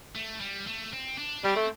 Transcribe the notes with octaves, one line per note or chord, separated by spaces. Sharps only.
A3
G3
A3
C4
D4
G3 C4
A3